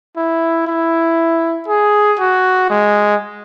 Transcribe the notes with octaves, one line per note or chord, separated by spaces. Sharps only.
E4
E4
G#4
F#4
G#3